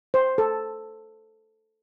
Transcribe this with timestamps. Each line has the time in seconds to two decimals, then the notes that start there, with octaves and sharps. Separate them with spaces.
0.14 C5
0.38 A4